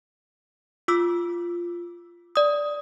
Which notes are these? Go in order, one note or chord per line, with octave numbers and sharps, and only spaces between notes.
F4 D6 E6
D5 D#6